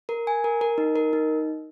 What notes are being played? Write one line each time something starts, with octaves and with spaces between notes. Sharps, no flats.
A#4
G#5
A#4
A#4
D#4
A#4
D#4